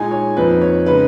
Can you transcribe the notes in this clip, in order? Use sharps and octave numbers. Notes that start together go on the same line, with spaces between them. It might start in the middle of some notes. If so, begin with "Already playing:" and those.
Already playing: A#2 G#3 D#4 G#5
C#5
F2 F3 A#3 D#4 B4
C#5
C#3 G#3 D#4 B4